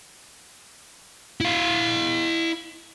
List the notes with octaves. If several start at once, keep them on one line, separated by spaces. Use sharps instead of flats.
E4 F5